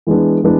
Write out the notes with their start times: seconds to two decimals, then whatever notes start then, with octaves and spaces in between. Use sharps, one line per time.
0.07 E3 G#3 B3 D4
0.44 E3 G#3 B3 D4